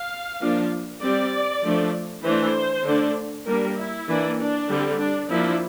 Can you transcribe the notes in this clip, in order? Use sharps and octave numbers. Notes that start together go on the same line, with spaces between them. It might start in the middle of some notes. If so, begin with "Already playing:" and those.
Already playing: F5
F3 A#3 D4
G3 C4 D5
F3 A3 D4
E3 A3 D4 C5
D3 A3 D4
G3 A#3 D4 A#4
E4
E3 A#3 D4
D4
D3 G3 C4
D4
F3 A#3 D4 E4